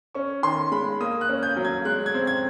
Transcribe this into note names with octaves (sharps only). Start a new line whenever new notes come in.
C#4 C#6
D#3 C6
G#3 B5
A#3 D#6
F#6
C#4
G6
F#3
G#6
G#3 F#6
G#6
C4
G#6